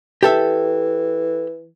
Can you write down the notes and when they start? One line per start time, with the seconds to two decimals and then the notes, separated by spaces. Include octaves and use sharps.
0.23 E3 G4 A4 E5